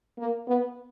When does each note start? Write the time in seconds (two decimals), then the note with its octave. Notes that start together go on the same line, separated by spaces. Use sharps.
0.19 A#3
0.48 B3